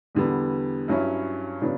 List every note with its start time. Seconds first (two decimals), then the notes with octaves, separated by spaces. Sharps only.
0.15 E2 D3 G3 B3
0.88 G2 F#3 C#4 E4
1.62 C#3 F#3 B3 D4